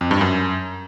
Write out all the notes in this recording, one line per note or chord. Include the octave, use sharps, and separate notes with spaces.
F2
G2
F#2